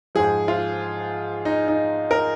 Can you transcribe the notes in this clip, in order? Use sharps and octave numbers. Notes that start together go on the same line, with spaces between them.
G#2 F3 G#4
F4
D#4
D#4
A#4